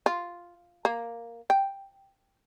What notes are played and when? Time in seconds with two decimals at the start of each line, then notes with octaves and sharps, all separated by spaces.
0.06 F4
0.85 A#3
1.50 G5